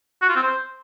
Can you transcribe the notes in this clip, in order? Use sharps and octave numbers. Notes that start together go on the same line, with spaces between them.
F#4
F4
C4
C5